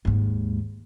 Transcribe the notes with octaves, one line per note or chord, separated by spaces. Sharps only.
D#2 G#2